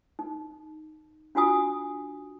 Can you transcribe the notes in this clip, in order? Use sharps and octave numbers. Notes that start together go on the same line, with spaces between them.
D#4
D4 F4 F#4 G#5 D#6